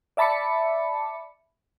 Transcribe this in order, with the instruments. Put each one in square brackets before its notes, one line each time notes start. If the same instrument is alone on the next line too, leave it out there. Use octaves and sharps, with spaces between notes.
[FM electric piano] D5 E5 A5 B5 D6 C#7